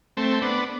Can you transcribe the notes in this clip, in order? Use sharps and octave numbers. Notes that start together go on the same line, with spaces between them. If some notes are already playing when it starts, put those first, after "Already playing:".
A3 C4
B3 D4